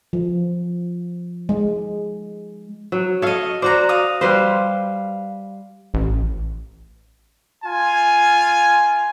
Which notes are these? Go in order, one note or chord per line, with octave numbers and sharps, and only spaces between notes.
F3
G#3
F#3
A4 C#5 D#5 F5
F#4 C5 D5 A#5
F5 D#6
G3 B4 C5 F5 C6
A1
F4 G#5